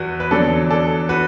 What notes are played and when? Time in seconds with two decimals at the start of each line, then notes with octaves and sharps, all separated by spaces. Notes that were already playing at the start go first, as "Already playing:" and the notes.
Already playing: E2 F#4 B4
0.20 B4
0.31 E2 D3 F#3 A4 D5
0.71 A4 D5
1.09 F#4 B4